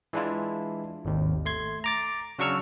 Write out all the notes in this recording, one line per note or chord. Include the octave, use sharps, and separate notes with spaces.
E3 G#3 D4 E4 F4
G#1 D#2
A3 C6 G#6
A#5 D6 A6
C#3 F#3 D4 C#6 E6 F6